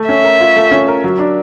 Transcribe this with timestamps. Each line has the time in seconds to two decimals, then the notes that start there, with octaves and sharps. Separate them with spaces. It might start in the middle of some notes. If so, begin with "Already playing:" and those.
Already playing: A3
0.08 C#4 E5
0.24 A#4
0.40 F4
0.56 A3
0.71 C#4
0.88 A#4
1.04 F#3
1.19 D4